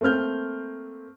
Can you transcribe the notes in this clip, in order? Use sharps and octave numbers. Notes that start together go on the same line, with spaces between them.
A3 A#3 C4 F6 G6